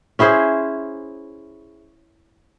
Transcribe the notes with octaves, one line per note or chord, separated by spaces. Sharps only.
C#4 E4 G#4 C5